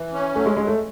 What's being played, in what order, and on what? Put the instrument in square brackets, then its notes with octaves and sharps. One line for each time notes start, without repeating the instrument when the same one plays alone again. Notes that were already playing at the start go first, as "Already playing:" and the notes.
Already playing: [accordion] E3
C#4
[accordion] F#3 [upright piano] A3
[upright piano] G#3
[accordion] F#3 [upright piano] G#3
[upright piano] A3